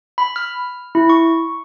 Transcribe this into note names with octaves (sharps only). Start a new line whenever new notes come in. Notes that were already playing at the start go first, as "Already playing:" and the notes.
B5
F6
E4
C#6